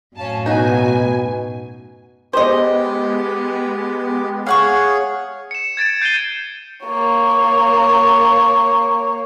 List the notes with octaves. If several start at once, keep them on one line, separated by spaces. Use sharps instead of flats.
F#2 A2 C#4 F5 A5
B2 D#4 F#4 G#5
G#3 B3 G4 C5 D#5
G#4 C#5 F5 F#5 C#6
C#7 E7
G#6 A6 C#7 D7
G6 C7 D#7 E7 G7
A#3 C#5